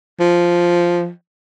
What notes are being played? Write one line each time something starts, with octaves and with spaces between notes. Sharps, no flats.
F3